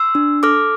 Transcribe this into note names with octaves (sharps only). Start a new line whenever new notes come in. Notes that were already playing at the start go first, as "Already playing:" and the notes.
Already playing: C6 E6
D4
A4 D6 F6